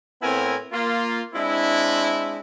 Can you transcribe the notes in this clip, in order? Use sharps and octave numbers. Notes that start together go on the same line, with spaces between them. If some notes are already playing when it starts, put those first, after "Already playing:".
A2 B3 C4 E4 A#4 G#5
A#3 F4
G#3 C4 D4 E4